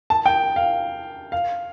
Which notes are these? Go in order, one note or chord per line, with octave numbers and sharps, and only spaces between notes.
A5
G5
F5
F5